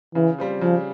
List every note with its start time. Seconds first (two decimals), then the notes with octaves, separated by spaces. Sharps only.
0.15 C#3 E3
0.39 G3 C4 F4
0.61 C#3 F3